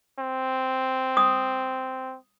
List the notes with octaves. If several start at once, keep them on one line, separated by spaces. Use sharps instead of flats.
C4
D#6